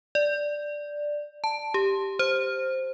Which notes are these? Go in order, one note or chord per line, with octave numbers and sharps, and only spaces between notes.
D5
A5
G4
C5